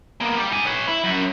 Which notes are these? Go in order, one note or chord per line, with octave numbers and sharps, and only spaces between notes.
A#3 B3
G4 D5
D#4 G#5
B4 C#5
E4
F#2